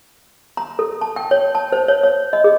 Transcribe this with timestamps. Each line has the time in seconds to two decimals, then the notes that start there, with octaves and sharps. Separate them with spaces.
0.57 A#5
0.79 A4
1.01 A5
1.16 G5
1.31 C#5
1.55 A5
1.72 C5
1.88 C#5
2.03 C#5
2.33 D#5
2.44 G#4